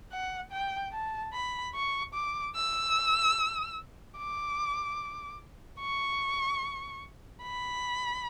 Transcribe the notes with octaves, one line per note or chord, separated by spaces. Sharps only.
F#5
G5
A5
B5
C#6
D6
E6
D6
C#6
B5